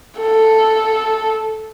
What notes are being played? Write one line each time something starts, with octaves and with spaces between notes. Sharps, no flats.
A4